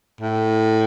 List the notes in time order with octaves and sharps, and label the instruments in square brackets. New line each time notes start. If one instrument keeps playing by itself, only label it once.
[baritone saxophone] A2